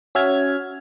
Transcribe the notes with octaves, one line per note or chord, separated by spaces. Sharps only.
C#4 F#4 E5 F6 G#6